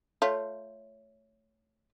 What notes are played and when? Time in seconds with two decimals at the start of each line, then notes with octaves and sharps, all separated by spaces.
0.22 A3 F4 C#5